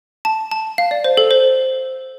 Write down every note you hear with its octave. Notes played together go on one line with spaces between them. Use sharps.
A5
A5
F5
D5
C5
A4
C5